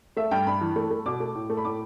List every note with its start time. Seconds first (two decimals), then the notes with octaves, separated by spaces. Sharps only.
0.17 A3 E5
0.31 G2 G5
0.47 G2 B5
0.61 E3
0.76 A3
0.91 A3
1.06 B2 D6
1.20 A3
1.35 A2
1.50 A3
1.57 B5
1.65 A2 D6